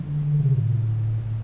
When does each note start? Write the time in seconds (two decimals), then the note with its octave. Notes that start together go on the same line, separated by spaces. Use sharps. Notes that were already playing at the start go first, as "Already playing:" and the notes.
Already playing: D3
0.39 C3
0.54 A2